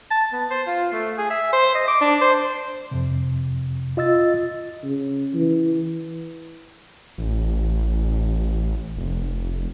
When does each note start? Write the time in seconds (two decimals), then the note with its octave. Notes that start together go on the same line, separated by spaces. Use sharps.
0.11 A5
0.32 B3
0.51 C5
0.67 F4
0.92 A3
1.18 G#4
1.30 E5
1.53 C5
1.75 D#5
1.88 D6
2.01 D4
2.22 C5
2.91 F2 C3
3.97 F4 D#5 E6 A6
4.84 C#3
5.34 E3
7.18 A1
8.97 F1